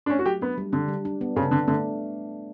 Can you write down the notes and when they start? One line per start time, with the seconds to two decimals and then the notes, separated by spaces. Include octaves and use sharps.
0.06 D4
0.09 A3 C#4
0.19 F#4
0.26 F#3 G4
0.42 B3 D4
0.58 G3
0.73 D3 D4
0.88 G3
1.05 D4
1.21 B3
1.36 C#3 A4
1.51 D3 D4
1.68 D3 A3